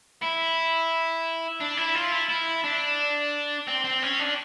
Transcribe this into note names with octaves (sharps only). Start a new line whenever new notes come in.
E4
D4
E4
F4
E4
E4
D4
C4
C4
C#4
D4